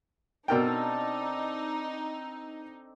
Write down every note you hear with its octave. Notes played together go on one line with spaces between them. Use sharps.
B2 C4 D4 D#4 A4 A#4 G5